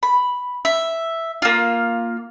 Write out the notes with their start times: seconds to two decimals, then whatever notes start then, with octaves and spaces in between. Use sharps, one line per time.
0.03 B5
0.65 E5
1.42 A#3 F4